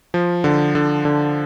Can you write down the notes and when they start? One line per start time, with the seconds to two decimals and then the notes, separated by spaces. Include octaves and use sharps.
0.14 F3
0.44 D3
0.75 D3
1.05 D3